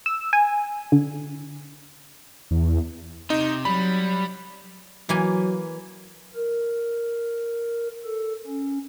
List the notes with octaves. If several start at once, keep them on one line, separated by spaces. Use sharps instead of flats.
E6
G#5
D3
E2
C3 D#4
F#3 G3 B5
E3 F#3 A#3 G#5
A#4
A4
C#4